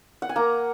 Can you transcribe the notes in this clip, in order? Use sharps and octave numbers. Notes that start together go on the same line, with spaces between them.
F#5
G#5
A#3 A#5